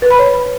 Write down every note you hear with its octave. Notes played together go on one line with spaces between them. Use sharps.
B4
B5
C#5